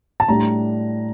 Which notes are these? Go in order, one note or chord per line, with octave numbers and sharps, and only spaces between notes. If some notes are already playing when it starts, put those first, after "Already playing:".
A5
A2 G3 D4 A#5